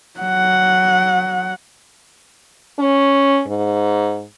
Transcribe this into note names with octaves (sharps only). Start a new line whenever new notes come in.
F#3 F#5
C#4
G#2